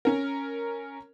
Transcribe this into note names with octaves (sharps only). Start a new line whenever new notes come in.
C#4 A#4